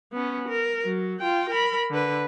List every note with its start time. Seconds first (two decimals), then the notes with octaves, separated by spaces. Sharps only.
0.13 B3 C#4
0.49 A#4
0.85 F#3
1.20 F4 G5
1.50 A#4 B5
1.91 D3 B4